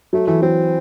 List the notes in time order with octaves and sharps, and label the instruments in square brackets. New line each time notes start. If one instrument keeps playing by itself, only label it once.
[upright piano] F#3 [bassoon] A3
[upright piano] E3 [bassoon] A3
[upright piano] F#3 [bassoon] C4